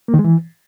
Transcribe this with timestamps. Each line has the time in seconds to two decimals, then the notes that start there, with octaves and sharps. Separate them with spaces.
0.08 A#3
0.14 D#3
0.19 G#3
0.24 E3